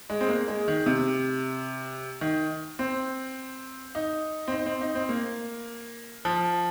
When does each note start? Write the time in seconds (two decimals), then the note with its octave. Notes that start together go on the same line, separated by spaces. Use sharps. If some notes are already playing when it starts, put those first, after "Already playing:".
0.10 G#3
0.21 C4
0.29 A#3
0.48 G#3
0.68 D#3
0.86 C3
2.21 D#3
2.79 C4
3.95 D#4
4.48 C4
4.52 D#4
4.66 C4
4.81 D#4
4.95 C4
5.09 A#3
6.25 F3